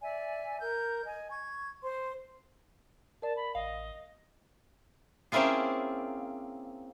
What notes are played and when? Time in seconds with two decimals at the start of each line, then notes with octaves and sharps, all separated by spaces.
0.02 D5 E5 G#5
0.60 A#4 G6
1.06 D#5 G#5
1.30 C#6 G#6
1.82 C5 C6
3.22 A#4 D5 A5
3.36 B5
3.55 A1 D#5 F5
5.32 A#3 C4 C#4 E4 F4 G#4